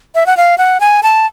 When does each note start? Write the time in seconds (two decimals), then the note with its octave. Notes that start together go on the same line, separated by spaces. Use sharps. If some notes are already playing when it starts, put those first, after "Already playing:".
0.15 E5
0.26 F#5
0.37 F5
0.58 F#5
0.80 G#5
1.03 A5